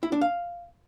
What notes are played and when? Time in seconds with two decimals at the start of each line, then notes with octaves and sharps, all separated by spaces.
0.03 E4
0.12 D4
0.21 F5